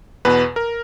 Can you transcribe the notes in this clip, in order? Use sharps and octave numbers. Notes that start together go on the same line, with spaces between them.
E2 B2 B4
A#4